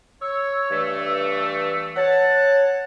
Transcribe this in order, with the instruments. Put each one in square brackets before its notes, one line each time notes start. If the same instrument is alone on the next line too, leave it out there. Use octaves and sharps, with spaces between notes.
[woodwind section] C#5 [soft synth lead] E6
[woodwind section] G2 E3 A3
[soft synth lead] C#5 [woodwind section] F#5 A5